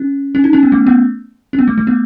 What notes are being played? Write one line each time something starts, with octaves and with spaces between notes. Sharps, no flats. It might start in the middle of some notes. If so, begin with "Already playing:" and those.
Already playing: C#4
C#4
D#4
C#4
B3
A3
B3
C#4
B3
A3
A3
B3